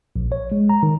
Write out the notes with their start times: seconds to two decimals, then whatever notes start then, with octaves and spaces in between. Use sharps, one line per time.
0.16 A#1
0.32 C#5
0.52 G#3
0.69 A#5
0.83 D#3